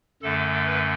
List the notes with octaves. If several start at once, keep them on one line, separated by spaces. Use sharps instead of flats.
F#2 D3 A3 A4
B4